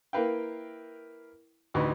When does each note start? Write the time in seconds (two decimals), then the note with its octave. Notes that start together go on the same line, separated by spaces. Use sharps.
0.13 A#3 E4 A#4 B4 F5 G5
1.74 A1 D2 D#4 B4 C#6